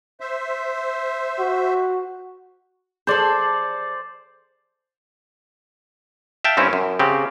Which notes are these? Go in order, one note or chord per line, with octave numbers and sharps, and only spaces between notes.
C5 E5
F#4
G#4 A4 C5 D5
E5 F5 G5 A5
G2 C4 C#4 E4 C5
F#2
C#3 C4 G4